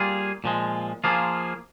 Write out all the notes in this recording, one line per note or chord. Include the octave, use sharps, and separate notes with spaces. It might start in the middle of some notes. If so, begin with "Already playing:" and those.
Already playing: G3 A#3 F4 G#4
A#2 F3 G#3
F3 A#3 F4 G#4